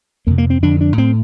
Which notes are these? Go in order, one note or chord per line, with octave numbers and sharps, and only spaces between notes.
F2 C3 A#3
A#3
C4
F2 D3 D4
D4
A2 C4